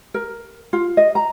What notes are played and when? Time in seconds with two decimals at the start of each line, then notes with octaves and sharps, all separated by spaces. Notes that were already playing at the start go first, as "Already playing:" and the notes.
0.14 A#4
0.73 F4
0.97 D#5
1.15 A#5